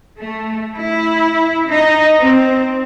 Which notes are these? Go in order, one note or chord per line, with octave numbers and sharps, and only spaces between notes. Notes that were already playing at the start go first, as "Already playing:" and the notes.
A3
E4
D#4
C4